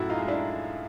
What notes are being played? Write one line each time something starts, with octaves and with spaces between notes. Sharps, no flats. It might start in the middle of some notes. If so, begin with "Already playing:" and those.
Already playing: F#2 A2 E4 F#4
D#4 F4
G#3
D4 E4